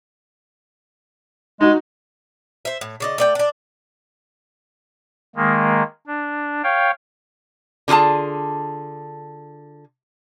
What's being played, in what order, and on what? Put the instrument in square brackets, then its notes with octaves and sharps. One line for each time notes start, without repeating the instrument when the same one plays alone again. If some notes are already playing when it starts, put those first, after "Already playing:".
[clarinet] G#3 [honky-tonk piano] D#4 F#4
[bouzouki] C5 E5
A2
C#3 D5 D#5
A3 D5 G5
D4 D5
[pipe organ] D#3 G#3 A#3
D4
C#5 F5 G5
[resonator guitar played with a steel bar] D3 F4 F#4 G#4 A5